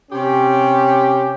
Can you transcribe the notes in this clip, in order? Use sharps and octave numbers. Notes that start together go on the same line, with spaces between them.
C3 C#4 G4